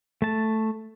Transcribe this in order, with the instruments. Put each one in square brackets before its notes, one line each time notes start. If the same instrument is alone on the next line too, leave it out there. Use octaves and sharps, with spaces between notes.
[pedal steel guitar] A3 A5